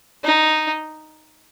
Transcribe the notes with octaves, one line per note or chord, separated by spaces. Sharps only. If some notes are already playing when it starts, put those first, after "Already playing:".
D#4